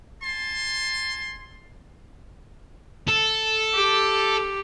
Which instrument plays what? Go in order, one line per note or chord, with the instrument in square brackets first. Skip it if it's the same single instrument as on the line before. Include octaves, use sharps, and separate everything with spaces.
[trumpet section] G#5 A5 C6
[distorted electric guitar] A4
[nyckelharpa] G4